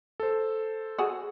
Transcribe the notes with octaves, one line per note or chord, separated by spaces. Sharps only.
A4 C5
F#4 G#4